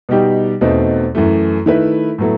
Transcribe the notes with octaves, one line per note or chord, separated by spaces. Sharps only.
B2 G3 D#4 G4
E2 B2 A3 C4 D#4
F#2 E3 A3
D#3 A3 E4 B4
A2 F#3 B3 E4 A4